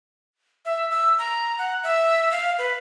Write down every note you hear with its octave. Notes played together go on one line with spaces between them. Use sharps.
E5
E6
A#5
F#5
E5
F5
B4